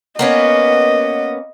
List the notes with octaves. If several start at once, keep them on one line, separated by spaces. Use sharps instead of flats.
A#3 B3 C#4 D#5